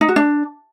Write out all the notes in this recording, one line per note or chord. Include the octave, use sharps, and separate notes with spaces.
D#4
F#4
D4